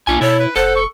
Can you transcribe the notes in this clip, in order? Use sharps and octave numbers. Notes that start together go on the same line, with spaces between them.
B1 A#3 D4 F4 G#5
B2 E4 A4 C#5
B4
F1 A4 C5 F#5
C#6